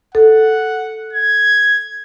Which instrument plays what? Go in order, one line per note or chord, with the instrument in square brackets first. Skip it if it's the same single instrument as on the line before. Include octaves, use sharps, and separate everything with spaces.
[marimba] A4 [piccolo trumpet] F#5
[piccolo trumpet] G#6